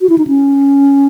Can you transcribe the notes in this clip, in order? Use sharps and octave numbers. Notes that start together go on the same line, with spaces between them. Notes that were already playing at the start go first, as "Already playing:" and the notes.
F#4
E4
D#4
C#4